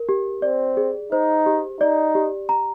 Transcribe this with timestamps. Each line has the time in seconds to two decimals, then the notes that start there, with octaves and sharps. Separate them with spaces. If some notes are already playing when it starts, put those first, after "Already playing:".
Already playing: A#4
0.09 G4
0.42 C4 D5
0.77 G#4
1.12 D#4 C5
1.46 G4
1.80 D#4 D5
2.15 G4
2.49 A#5